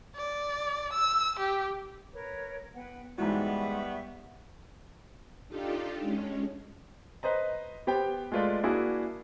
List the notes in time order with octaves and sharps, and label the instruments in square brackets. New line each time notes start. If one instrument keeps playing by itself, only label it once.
[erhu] D5
E6
G4
[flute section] A#4 B4 C#5
[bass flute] B3 [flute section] B4 F#5 G5
[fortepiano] G#2 E3 F#4 [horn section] G3 B3 [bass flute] G#3 [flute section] E5 C#6
[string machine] D4 D#4 F4 G4 A4
G#3 C#4
[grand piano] B4 C5 D#5 A#5
B3 G4 C5 G5
G#3 A3 F4 B4 D5
A#3 D4 E4 F#4 G#4